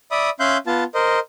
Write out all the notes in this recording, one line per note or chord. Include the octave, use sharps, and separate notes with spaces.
D5 E5 B5 D#6
C#4 E5 F5 C6 F#6 G6
B3 F4 A5
A#4 C5 D#5